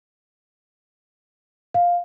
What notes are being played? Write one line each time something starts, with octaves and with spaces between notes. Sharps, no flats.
F5